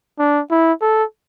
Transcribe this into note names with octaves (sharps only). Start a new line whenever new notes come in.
D4
E4
A4